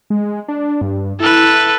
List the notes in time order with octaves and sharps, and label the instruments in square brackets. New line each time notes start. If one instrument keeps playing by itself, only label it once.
[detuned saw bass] G#3
D4
G2
[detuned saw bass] E4 [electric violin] A4 B4